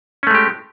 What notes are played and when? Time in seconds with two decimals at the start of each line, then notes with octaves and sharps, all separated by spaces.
0.23 C#4
0.27 A3
0.31 G#3
0.35 G4